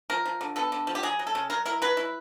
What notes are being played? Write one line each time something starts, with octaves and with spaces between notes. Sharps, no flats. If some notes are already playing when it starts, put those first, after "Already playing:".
F3 A#4
F3
D3
B3 A4
D3
F3
G4
F#3 G#4
F#3
A4
C#3
F#3 A#4
E4 A#4
F#3 B4
E4